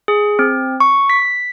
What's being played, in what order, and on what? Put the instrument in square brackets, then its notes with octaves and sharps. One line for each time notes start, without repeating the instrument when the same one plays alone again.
[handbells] G#4
C4
C#6
B6